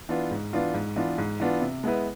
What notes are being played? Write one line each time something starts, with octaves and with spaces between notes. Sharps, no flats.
E3 B3 D4 F4
G#2
E3 B3 D4 F4
G#2
E3 B3 D4 F4
G#2
E3 B3 D4 F4
C3
G#3 B3 E4 B4